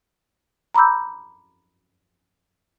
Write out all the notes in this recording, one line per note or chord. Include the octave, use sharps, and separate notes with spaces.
A#5 B5 D6 E6 G6